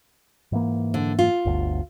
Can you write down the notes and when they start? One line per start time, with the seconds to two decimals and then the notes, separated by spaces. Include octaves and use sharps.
0.52 G#2 E3 A#3
0.94 D3
1.19 F4
1.45 G1 D2